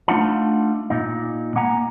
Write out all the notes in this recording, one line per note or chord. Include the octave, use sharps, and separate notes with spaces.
A3 D4 D#4 F4 F#5 A5
A#2 D#4
A#3 F#5 G#5 A#5